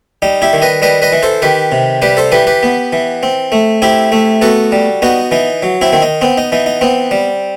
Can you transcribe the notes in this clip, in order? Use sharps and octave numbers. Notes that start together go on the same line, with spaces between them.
G3 D#4
E4 G4
D#3
B4 D#5
G3 B4 D#5
B4 D#5
E3
A4 C5
D#3 G4 B4
C3
G3 G4 B4
A4 C5
E3 G4 B4
G4 B4
B3
E3
C4
A3
C4 E4 G4
A3
B3 F#4 A4
G3
B3 D#4 F#4
E3 D#4
F#3
C4 E4
D#3 C4
D#4
B3 C4
D#4
E3 D#4
D#4
B3 C4
G3